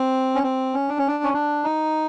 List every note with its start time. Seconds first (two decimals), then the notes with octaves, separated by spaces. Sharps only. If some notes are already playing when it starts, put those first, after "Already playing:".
Already playing: C4
0.35 C#4
0.43 C4
0.74 C#4
0.89 D4
0.98 C#4
1.08 D4
1.23 C#4
1.34 D4
1.64 D#4